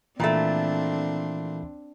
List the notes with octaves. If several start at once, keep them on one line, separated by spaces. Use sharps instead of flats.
A#2 E3 A3 C4 D4 B5 A6